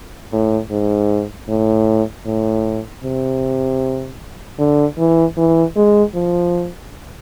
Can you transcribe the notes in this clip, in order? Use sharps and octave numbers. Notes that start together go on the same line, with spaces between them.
A2
G#2
A2
A2
C3
D3
E3
E3
G#3
F3